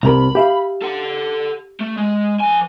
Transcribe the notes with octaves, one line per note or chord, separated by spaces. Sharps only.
C2 C3 A#4 A#5 B5
G4 E5 F5
A4 F#5
A3
G#3
F3 G#5